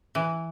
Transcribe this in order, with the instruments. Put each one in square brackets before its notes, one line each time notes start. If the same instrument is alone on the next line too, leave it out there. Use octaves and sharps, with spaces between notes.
[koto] E3